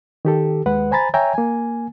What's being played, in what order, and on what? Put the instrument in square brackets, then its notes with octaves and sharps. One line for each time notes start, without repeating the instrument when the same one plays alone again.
[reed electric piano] D#3 G4 A4
D#2 G#3 B4 F#5
C5 G#5 A#5 B5 A6
C#5 E5 G5 G#5 A#5
A#3 G#5